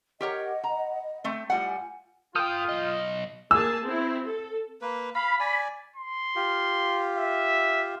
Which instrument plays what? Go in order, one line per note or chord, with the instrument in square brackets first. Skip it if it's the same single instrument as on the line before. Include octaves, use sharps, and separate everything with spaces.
[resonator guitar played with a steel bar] G4 A#4 C#5 [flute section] D#5 F#5
[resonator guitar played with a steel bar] A#5
A3 C4
[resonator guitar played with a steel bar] A2 G3 F#5 [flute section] F4 G#5
[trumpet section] F4 [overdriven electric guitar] A4 G5 [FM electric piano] D#6 F6 G6
[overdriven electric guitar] B1 D#5
[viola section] A#3 G#4 A5 [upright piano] E6
[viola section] C4 E4
A4
[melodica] A#3 B4
[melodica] F5 [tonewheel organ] B5
[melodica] D5 G#5
[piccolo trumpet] C6
[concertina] F4 G4
[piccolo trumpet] E5